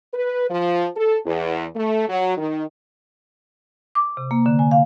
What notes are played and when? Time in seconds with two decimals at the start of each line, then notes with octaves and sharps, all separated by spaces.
0.14 B4
0.50 F3
0.97 A4
1.26 E2
1.76 A3
2.09 F#3
2.37 D#3
3.95 D6
4.17 C3
4.31 A#3
4.46 D3
4.59 G#5
4.71 F5